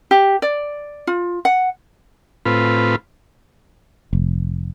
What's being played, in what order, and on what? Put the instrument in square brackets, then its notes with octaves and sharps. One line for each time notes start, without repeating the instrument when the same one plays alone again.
[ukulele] G4
D5
F4
F#5
[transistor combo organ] A2 C4 F4 B4
[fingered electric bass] F1